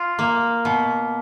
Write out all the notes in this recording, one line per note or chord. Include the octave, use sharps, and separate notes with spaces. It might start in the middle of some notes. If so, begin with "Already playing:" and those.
Already playing: F4
A#3
B2